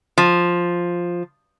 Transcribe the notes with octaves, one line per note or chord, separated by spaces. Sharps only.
F3